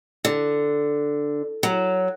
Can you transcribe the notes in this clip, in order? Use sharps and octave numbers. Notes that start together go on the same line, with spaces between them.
D3
F#3